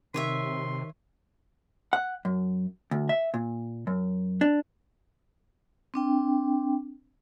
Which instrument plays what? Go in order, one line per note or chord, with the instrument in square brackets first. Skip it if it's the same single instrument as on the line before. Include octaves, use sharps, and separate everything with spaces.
[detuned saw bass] C3 [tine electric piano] D#3 [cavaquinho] B4 C#5 E5 [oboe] C6
[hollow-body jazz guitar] F#5
F#2
D2
E5
A#2
F#2
D4
[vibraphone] C4 D4 G5